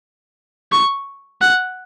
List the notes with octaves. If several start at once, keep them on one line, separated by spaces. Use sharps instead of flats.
C#6
F#5